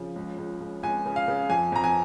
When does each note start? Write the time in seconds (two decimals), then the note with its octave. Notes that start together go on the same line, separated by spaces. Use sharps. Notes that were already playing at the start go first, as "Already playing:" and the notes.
Already playing: C#3 F3
0.16 C#2
0.38 C#2
0.61 C#2
0.83 C#2 G#5
1.06 C#3
1.16 F5
1.28 C#3
1.50 F2 G#5
1.72 F2 A#5
1.84 G#5